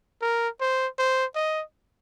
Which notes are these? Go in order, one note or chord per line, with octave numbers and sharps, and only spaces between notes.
A#4
C5
C5
D#5